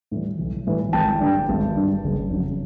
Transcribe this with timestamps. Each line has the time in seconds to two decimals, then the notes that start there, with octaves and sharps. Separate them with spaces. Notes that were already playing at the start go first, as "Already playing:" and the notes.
0.11 A2 E3 G3
0.39 B1
0.67 A2 E3 G3
0.93 G#1 G5 A5
1.20 G2 D3 G3
1.49 G#1
1.76 G2 D3 G3
2.04 F#1
2.30 F2 C#3 F#3